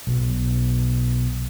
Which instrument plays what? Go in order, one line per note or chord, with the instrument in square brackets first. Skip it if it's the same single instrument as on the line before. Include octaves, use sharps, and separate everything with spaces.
[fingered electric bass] B1